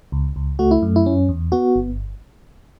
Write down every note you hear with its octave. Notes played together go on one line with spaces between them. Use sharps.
C#2
C#2
A3 F#4
E4
F#2
E4
C#4
E2
B3 F#4
G1